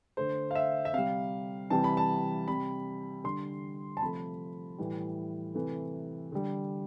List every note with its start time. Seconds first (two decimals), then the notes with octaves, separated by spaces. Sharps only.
0.17 D3 A3 C5
0.51 F5
0.55 E5
0.85 E5
0.93 C3 G3 F5
1.70 C3 E3 G3 A5
1.84 B5
1.97 A5
2.48 C3 G3 B5
3.24 D3 G3 C6
3.97 A5
4.02 C3 F3 A3 B5
4.78 A2 E3 G3
5.55 C3 E3 A3
6.32 D3 G3